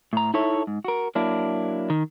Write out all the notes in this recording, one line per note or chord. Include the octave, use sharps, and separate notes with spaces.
A2 A#5
D#4 E4 A4 C#5 E5
G#2
F#4 A#4
F#3 A#3 D4 E4
D#3